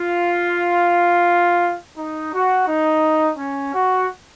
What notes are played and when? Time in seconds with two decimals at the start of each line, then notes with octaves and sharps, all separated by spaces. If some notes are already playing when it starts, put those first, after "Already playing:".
Already playing: F4
1.98 D#4
2.33 F#4
2.68 D#4
3.38 C#4
3.74 F#4